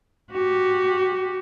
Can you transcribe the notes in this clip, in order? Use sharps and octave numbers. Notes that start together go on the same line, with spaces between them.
F#4 G4